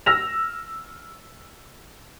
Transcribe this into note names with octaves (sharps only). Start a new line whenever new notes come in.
E6 F6 A#6 E7 F7